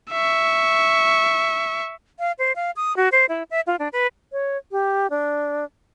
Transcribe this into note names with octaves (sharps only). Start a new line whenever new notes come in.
E5 C#6
F5
C5
F5
D#6
F#4
C5
E4
E5
F4
D4
B4
C#5
G4
D4